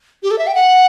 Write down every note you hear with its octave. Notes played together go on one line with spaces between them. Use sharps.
G4
A4
E5
G5
F#5